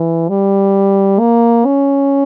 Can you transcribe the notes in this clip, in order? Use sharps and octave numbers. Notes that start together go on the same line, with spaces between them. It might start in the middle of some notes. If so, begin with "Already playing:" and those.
Already playing: E3
G3
A#3
C#4